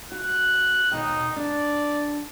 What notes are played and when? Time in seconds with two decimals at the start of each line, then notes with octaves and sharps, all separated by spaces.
0.12 F#4 F#6
0.92 D#2 B2 D#4 G5
1.36 D4 D5